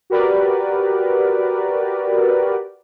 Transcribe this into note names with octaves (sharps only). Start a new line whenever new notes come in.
F#4 G4 A#4 B4 D5